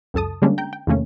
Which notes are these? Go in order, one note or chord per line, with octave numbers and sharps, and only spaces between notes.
C#2 F#2 A4 A5 D#6
D3 G3 G#3 A#3 C#4 D4
G5 A#5 G6
G5
E2 C3 D#3 A3 A#3 C#4